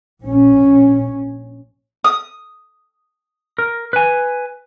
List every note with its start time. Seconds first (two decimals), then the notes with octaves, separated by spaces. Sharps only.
0.24 A#1 C#4
2.04 D#6
3.58 A#4
3.93 B4 G#5